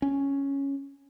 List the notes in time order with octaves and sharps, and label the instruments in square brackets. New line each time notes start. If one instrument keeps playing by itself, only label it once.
[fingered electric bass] C#4